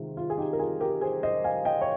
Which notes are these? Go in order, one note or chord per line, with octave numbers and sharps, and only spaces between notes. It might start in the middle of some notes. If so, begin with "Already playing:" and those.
Already playing: C3 D#3 G#3 F4
F4
G#4
D#4 G4
A#4
F4 G#4
G4 A#4
G#4 C5
C5 D#5
F5 G#5
D#5 G5
C#5